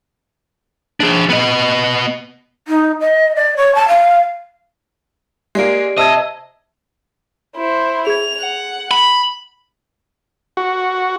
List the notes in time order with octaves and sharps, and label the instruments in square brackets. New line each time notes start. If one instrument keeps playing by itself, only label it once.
[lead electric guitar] D4 G#4
B3 D#5
[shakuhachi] D#4
D#5
D5
C#5
A5
F5
[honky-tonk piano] G#3 A#3 [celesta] G4 D5 D7
[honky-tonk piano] C3 E6 G#6 [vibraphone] C5 E5 A5 [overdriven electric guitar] D#5
[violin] E4 C5
[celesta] G#4 G#6 [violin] F7
[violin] F#5
[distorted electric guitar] B5
[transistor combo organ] F#4